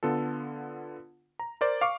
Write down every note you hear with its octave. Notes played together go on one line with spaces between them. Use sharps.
D3 B3 F4 A4
A#5
A#4 C5 D5
F5 C#6 D6